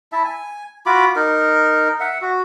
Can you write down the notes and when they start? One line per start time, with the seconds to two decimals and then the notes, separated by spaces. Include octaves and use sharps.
0.12 E4 E5 A5
0.24 G#5
0.86 F4 F#4 B5 D6
1.16 D#4 A#4
2.00 E5 F#5
2.22 F#4